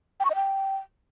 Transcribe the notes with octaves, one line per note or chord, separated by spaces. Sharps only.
G5
C#6
D#5
G5